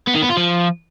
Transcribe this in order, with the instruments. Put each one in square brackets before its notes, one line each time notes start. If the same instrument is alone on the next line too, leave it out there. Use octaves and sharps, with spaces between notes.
[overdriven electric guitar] B3
D#3
B3
F4
F3